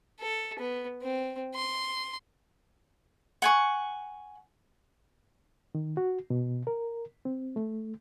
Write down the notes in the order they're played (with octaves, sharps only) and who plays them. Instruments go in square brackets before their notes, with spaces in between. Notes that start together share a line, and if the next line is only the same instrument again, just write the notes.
[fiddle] A4
B3
C4
C6
[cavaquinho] F#5 G#5 C#6
[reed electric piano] D#3
F#4
B2
A#4
C4
A3